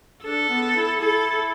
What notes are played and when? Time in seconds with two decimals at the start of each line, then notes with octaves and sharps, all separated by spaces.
0.23 D4 A4
0.49 B3
0.76 E4
1.01 E4 A4